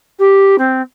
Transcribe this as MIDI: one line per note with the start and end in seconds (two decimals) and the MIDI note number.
0.19 0.56 67
0.58 0.81 60